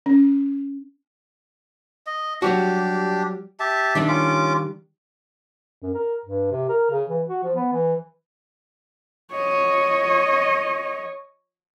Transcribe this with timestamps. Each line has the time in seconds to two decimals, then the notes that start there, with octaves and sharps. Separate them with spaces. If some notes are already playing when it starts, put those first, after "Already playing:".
0.06 C#4
2.07 D#5
2.42 F#3 G3 D4 F#4 G4
3.60 G4 E5 A5
3.95 D#3 G3 D4 E5
4.08 C#4 F4 D6
5.83 F#2
5.94 A#4
6.25 G2
6.51 C3
6.69 A#4
6.91 C#3
7.09 E3
7.29 F#4
7.43 F3
7.55 B3
7.73 E3
9.32 C#5 D#5